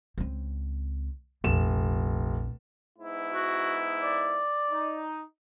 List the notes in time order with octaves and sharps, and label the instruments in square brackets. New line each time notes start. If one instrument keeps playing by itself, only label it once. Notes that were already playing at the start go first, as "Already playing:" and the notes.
[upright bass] C#2 C4
[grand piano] F1 E7 [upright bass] A#1 C4
[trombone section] G#2 B3 E4
[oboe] F#4
D5
[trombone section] D#4